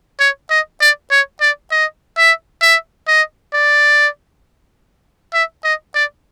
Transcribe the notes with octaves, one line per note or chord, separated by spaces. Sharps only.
C#5
D#5
D5
C#5
D5
D#5
E5
E5
D#5
D5
E5
D#5
D5